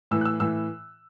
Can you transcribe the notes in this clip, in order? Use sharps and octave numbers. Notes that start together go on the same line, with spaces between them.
A2 E3 E6
F#6
E6
A2 E3 E6